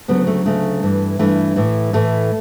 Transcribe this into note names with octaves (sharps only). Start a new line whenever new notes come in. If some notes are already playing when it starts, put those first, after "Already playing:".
D2 C#3 F#3 B3
A3
D2 C#3 F#3 A3
G2 E3
G2 E3 A3
A2 E3
A2 E3 A3